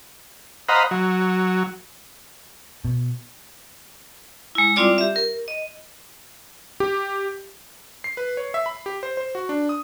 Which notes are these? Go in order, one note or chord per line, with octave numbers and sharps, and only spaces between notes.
C5 D#5 F5 F#5 A#5 B5
F#3
B2
G#3 E4
G3 C4 E4 F4 D5 D6
G4 E5
A#4
D#5
G4
C7
B4
C#5
E5
B5
G4
C5
C5
F#4
D4
D#6